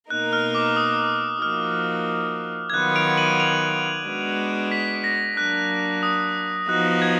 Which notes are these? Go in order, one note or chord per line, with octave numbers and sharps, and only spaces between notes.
B2 A#3 D#4 A#4 F#6
F6
D6
D#6
F3 A#3 D#4 F#4 F6
G#6
D#3 F#3 B3 F4 F#6
D7 F7
D#7 F#7
D7 F7
G#3 B3 D4 F#4 B4
B6
A#6
F#3 A#3 D4 F#6
D#6
F3 B3 D#4 F#4 F#6
G#6